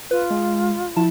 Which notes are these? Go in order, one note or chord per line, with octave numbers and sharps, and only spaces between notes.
F4 B4
G#3
F3 E4 A5